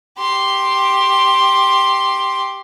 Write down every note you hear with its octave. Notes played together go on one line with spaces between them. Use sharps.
G4 C6